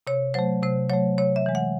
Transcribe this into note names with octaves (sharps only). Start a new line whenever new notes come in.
C3 C#5
F#3 A3 C5
C3 C5
F#3 A3 C#5
C3 C#5
E5
E3 G#3
F#5